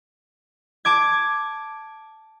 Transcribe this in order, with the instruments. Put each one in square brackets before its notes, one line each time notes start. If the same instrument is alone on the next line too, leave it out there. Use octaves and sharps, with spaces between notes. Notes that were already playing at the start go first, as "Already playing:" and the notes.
[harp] A5 D6 G#6